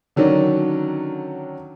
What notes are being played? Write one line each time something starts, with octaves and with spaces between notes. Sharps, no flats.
D3 D#3 F#3 C#4 D4